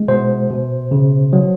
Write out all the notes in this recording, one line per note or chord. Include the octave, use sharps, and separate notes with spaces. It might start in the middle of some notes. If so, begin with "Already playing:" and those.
Already playing: G#3
B2 C5
B2
C#3
F#3